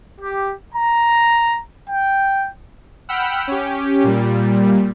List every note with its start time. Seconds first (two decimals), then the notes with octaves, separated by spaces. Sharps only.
0.19 G4
0.74 A#5
1.88 G5
3.09 F#5 G5 B5 E6 F6
3.47 C#4 G4
4.04 A#2 G3